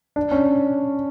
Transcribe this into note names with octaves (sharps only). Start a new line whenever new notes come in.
D4
C#4